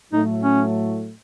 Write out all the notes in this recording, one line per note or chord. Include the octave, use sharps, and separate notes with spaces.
A2 F#3 A3 D#4
C#4